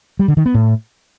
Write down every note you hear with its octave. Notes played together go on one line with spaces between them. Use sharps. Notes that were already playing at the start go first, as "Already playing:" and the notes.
G3
D3
D#3
B3
A2